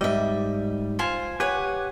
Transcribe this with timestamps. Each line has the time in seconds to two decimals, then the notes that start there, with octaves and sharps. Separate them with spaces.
0.01 G#2 G3 D#5 E5
0.99 F4 C5 G#5
1.40 G4 B4 C#5 F#5 G#5